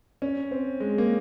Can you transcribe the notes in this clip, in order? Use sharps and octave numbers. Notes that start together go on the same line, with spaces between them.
C#4
C4
G#3
A#3